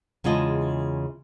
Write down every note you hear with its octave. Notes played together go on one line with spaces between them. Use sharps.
E2 C#3 G#3 F4 D#5 A5